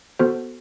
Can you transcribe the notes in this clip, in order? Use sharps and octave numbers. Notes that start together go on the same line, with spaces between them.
B3 F#4 A4 C5